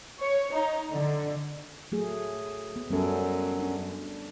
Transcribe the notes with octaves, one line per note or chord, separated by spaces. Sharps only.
C#5
D#4
D3
F#3 A3 G#4
B3
F#2 G3 C#4 A4
D4